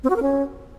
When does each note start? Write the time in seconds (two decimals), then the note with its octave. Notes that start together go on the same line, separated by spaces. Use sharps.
0.04 C4
0.10 F#4
0.16 A#4
0.22 C#4